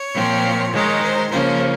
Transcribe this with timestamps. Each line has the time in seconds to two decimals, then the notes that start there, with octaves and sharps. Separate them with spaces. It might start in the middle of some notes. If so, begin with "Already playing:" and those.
Already playing: C#5
0.15 A#2 F3 C4
0.73 D#3 G#3 D#4 C#5
1.02 C5
1.30 C#3 F3 A#3 C#4 C5